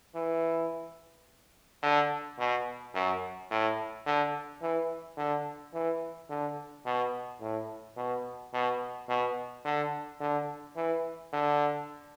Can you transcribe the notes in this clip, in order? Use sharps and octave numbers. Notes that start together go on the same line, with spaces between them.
E3
D3
B2
F#2
A2
D3
E3
D3
E3
D3
B2
A2
B2
B2
B2
D3
D3
E3
D3